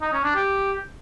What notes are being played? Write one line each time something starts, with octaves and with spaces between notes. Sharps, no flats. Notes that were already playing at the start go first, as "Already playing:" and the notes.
D#4
C#4
D4
G4